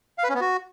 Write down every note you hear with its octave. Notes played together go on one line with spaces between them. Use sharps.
F5
B4
C#4
B3
F#4